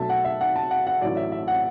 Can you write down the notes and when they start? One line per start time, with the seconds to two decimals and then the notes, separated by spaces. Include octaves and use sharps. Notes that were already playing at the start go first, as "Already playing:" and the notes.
Already playing: B1 B2 F#3 A3 E5 A5
0.09 F#5
0.25 E5
0.41 F#5
0.56 A5
0.71 F#5
0.87 F#5
1.01 A1 A2 F#3 D5
1.17 E5
1.32 E5
1.48 F#5